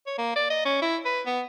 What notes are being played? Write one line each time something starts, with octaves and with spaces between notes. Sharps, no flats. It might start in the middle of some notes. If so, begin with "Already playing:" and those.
C#5
A#3
D5
D#5
C#4
E4
B4
B3